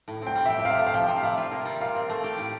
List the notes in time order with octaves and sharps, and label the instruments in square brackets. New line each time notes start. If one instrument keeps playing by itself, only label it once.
[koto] A2
[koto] C4 [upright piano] G5
[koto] G3
[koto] G4 [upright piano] E5
[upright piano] E5
[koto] C3 [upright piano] F5
[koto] A3
[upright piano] F5
[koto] F3 [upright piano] G5
[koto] C3
[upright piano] F5
[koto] G3 [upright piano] E5
[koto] F4
A#3
G3
[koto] A#2 [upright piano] F5
[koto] C4
A3
G4
A2